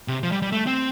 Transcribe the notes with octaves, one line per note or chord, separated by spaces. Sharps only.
C3
F3
G3
G3
A3
C4